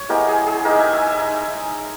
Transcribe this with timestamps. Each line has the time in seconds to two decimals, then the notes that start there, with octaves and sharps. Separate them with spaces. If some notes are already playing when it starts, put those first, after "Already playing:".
Already playing: C#5
0.09 G#3 B3 E4 G4 A#4
0.28 G#4
0.46 G#4
0.65 G#3 D#4 G4 A#4
0.79 E5 G#5
0.93 E5 G#5
1.06 E5 G#5
1.21 G#3 D#4